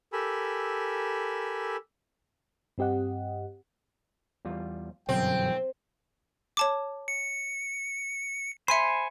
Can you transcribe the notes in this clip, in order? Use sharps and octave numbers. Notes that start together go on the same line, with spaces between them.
G4 A4 A#4 G#5 B5 E6
G2 C4 G4 D#5 F#5
E2 G3 F4
G1 F#2 B2 E3 F#3 C4 G5
C#5 A5 D6
C#7
C5 E5 G#5 B5 C6 C#7